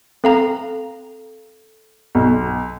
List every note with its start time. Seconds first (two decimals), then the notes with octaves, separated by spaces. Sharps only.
0.24 C4 A4 F5 A#5
2.15 B1